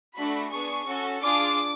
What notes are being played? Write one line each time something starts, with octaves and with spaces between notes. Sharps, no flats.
A3 D4 F#4 B5
B3 D4 G#4 C#6
C#4 F#4 A4
D4 F4 G#4 D6